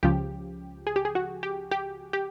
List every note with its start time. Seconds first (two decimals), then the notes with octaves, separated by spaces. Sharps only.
0.03 C#2 C#3 F3 G4
0.87 G#4
0.96 G4
1.05 G#4
1.15 F#4
1.43 G4
1.71 G4
2.13 G4